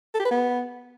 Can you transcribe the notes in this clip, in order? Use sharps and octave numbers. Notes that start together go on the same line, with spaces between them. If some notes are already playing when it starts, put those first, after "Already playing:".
A4
G4
B4
B3